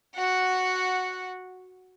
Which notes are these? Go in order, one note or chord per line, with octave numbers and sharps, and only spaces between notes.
F#4 F#5